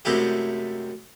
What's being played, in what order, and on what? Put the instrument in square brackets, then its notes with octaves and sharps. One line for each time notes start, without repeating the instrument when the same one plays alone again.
[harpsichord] F#2 C3 G#3 A3 E4 G4